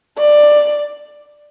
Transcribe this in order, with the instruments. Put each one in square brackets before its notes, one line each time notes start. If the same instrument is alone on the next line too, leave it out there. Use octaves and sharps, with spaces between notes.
[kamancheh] D5